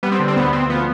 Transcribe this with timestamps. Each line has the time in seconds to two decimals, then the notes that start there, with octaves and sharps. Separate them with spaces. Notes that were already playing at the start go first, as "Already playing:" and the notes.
0.03 G3 B3
0.12 C4
0.19 D3
0.28 C4
0.36 D2 B3
0.53 D2 C4
0.70 F3 B3